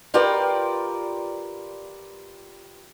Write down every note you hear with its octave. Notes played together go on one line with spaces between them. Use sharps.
F4 G4 A#4 B4 D5 G5